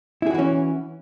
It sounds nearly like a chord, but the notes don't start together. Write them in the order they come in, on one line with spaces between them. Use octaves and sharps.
E4 G#4 F#4 E3 C#4